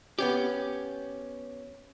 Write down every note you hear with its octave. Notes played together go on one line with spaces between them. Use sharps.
B3 C#4 G4